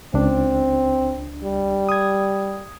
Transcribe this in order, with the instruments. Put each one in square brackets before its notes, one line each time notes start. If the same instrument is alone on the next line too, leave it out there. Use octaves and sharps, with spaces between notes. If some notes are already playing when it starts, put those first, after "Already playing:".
[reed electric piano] C#2 D4 [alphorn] C4
[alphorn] G3
[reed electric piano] D#6 G#6